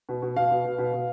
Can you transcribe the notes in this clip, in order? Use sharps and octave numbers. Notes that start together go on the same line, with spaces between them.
B2
B2
B2 F5
B2
B2
B2
B2